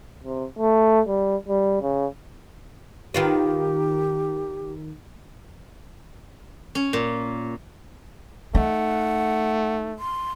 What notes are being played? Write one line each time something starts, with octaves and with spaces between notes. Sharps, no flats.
C3
A3
G3
G3
C#3
D#3 F4 G4 B4
C#4
A#2
A3 D#4 F#5
C6